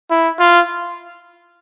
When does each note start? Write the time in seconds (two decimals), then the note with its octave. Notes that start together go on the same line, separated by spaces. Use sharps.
0.10 E4
0.39 F4